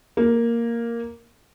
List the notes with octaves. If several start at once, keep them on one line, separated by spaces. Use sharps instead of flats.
A#3